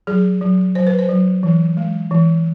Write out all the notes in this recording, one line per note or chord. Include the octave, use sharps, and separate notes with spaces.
F#3 G#4
F#3
F#3 C5
B4
C5
F#3
E3
G#3
E3